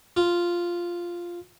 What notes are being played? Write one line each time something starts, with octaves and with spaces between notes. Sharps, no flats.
F4